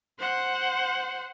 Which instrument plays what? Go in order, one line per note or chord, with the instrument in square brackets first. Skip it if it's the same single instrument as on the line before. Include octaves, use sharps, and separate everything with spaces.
[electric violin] C5 F#5